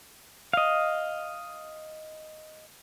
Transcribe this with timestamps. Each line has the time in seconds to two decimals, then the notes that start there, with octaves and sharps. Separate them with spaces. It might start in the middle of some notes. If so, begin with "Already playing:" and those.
0.53 D#5 F5